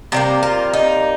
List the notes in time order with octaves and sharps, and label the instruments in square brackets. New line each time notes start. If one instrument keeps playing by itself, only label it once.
[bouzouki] C3 G3 A#3 G4
F4
D#4